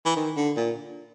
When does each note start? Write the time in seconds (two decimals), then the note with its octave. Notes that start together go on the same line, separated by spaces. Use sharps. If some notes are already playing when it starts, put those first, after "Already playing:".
0.05 E3
0.16 D#3
0.37 D3
0.57 A#2